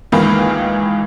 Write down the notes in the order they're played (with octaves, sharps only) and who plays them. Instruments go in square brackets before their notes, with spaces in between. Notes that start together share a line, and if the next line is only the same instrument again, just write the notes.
[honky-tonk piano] C#2 D#3 E3 A#3 B4 F5